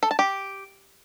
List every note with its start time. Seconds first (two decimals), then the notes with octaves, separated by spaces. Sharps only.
0.03 A4
0.11 A5
0.19 G4